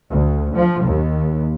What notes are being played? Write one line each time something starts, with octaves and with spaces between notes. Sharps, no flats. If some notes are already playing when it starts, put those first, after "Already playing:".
D2
F3
D#2